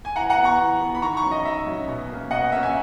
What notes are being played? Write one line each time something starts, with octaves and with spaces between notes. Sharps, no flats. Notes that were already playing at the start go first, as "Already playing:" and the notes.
G#5
E3 F#5 A#5
F#5 A#5
B3
A#5 C#6
E3
B3
B5
D#3 A#5 C#6
A#5 C#6
F#3 C#4
D#5
D#3 E5
F#3 C#4
B2
A#3 C#4
B2 D#5 F#5
A#3 C#4 E5
E5 G#5